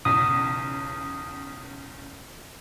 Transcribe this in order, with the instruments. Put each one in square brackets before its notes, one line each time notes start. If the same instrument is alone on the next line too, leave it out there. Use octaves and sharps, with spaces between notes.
[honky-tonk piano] B1 E2 C#3 [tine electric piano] D#6